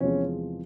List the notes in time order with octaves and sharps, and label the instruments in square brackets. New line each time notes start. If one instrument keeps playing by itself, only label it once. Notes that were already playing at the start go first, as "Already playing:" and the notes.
[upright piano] E2 C3 F3 G#3 C#4